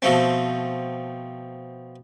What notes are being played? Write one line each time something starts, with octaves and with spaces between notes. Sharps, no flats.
B2 F3 A3 C4